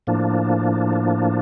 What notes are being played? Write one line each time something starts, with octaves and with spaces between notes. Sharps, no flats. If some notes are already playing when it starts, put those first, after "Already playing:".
A2 F3 A#3 D4